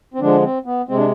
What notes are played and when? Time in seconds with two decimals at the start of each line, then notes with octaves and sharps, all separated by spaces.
0.14 C4
0.20 D3 F3 G#3 D4
0.42 C4
0.66 B3
0.88 C3 G#3 C4
0.97 D4